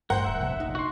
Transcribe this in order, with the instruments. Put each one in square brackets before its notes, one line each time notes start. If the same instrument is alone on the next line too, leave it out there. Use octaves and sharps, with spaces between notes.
[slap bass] G1 G2 A3 [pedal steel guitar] A#4 C5 G5 [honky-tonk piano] F#5
[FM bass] D#1 [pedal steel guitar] E5
[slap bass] F1 A#1 [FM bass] C3
[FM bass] D#4
[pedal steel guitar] F#4 C6